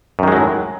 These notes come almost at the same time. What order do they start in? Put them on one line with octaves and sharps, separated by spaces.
F#2 D#3 G#3 F#3 A2